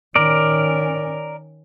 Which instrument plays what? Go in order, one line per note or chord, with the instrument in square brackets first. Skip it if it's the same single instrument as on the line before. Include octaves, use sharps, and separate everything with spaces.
[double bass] D#3 C#4 [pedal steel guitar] A#4 D5